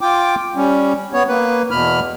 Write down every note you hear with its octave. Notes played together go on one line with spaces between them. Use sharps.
F4 G5 D6
G3 C#4
B3 C#5
A#3 B4
E2 B2 B5 F6